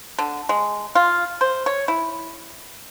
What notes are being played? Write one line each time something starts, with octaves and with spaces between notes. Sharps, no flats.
D3
G#3
F4
C5
C#5
E4